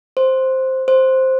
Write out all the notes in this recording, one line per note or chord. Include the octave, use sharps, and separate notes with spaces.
C5
C5